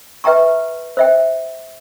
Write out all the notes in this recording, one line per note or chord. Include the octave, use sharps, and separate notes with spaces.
B4 E5 G5 A#5 C#6
C5 E5 G5